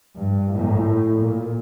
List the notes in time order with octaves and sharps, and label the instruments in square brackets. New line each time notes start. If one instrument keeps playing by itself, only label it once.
[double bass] G2
A2
A#2